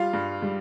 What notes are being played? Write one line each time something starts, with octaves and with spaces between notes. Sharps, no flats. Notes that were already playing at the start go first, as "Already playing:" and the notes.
Already playing: G3 F4 F5
G2
G3